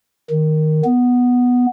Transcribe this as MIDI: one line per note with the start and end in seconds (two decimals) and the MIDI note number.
0.30 0.82 51
0.84 1.66 59